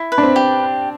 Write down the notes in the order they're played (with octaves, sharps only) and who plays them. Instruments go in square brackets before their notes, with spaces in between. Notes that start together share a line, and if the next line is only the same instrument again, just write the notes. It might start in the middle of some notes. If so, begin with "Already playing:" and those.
Already playing: [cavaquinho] E4
B4
[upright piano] D4
C4
[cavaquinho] G4